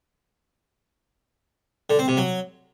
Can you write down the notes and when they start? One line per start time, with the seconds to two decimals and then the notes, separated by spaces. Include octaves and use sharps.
1.90 D3
1.99 C4
2.08 C3
2.17 F#3